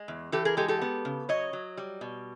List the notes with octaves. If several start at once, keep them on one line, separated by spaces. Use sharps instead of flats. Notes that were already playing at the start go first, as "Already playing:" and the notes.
Already playing: G#3
E2
E3 G4 A4
G#4 A#4
G#3 G4 A4
G4 A4
B3
C#3
F#3 C#5 D#5
F#3
G3
B2